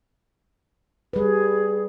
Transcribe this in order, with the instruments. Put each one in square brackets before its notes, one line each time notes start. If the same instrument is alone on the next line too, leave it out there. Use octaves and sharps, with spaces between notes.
[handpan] G3 B4 [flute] G#4